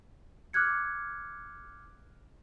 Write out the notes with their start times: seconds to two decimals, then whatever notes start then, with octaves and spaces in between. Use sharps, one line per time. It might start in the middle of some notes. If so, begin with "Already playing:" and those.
0.53 D6 F6 F#6 G#6 C#7